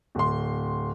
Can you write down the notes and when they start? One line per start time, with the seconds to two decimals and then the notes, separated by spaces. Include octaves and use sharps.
0.15 D1 C6